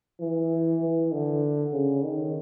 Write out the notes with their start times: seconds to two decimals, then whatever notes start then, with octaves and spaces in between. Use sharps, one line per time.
0.21 E3
0.82 E3
1.12 D3
1.73 C#3
2.03 D#3